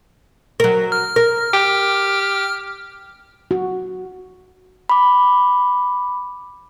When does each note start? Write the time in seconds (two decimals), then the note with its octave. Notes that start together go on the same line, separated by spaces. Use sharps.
0.60 F#3 A#4
0.92 F6
1.16 A#4
1.54 G4
3.51 F#4
4.89 B5 D6